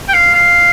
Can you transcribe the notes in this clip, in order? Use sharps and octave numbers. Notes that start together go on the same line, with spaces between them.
G5
F5
F5